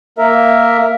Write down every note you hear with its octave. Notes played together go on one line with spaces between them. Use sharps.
A#3 A#4 E5